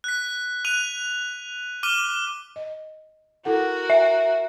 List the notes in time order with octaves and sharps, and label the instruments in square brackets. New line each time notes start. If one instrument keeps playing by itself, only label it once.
[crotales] F#6 B6
F#6 D#7 F7
D6 F6 D#7 G7
[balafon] D#5
[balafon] E4 A4 F#5 [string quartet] F#4 A#4
[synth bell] E5